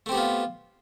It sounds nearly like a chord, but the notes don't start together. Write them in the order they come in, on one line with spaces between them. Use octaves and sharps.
A3 C4 G4 B3 F4